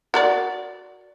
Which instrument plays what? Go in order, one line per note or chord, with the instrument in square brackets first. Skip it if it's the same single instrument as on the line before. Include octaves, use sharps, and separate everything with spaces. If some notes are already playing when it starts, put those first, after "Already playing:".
[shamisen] F#4 A#4 D5